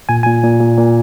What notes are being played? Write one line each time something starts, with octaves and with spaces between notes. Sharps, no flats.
A#2 G#5
A#2 G#5
A#2
A#2
A#2